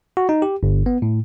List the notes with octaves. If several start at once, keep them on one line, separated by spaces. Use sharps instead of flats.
F#4
D#4
G4
G1
B3
A2